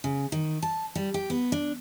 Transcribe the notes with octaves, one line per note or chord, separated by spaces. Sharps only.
C#3
D#3
A5
G3
G4
B3
D4